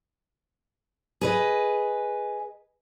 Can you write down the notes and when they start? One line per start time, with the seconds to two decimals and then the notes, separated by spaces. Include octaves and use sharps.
1.21 G#4 B4 D#5